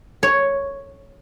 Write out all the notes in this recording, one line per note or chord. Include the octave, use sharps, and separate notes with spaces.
C#5